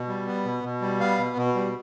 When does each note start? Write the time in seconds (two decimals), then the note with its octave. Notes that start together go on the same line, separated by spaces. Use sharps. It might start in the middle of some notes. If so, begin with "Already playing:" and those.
Already playing: B2
0.08 G3
0.27 B3
0.45 B2
0.64 B2
0.81 G3
1.00 B3 F5
1.18 B2
1.37 B2
1.55 G3